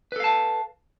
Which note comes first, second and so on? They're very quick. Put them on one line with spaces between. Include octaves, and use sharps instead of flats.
B4 A4 F5 A5